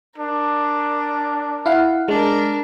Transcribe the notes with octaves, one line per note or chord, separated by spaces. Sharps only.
D4 A#4
E4 F5 F#5
G#3 D4 A#4